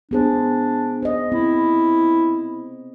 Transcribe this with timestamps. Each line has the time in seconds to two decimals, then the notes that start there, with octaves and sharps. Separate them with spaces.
0.11 B3 D4 G#4 C5
1.03 C5 D#5
1.32 C4 E4